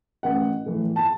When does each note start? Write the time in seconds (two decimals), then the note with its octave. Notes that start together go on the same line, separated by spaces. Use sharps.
0.23 A1 F#5
0.66 A2 E3
0.96 A5